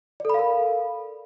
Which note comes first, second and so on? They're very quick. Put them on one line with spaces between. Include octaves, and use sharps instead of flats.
D5 A4 B5 F5 A#4